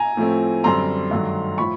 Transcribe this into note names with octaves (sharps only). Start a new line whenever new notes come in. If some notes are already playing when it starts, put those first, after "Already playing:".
Already playing: G#5 A#5
A2 F3 A3 C4
F#2 D3 G3 C4 A#5 C6
G2 D#3 F#3 A3
A2 F3 B5 C#6